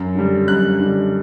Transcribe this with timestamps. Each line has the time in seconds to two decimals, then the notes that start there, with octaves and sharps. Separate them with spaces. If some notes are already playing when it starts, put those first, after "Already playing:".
Already playing: F#2
0.15 D3 G3
0.48 F#2 F#6
0.80 D3 G3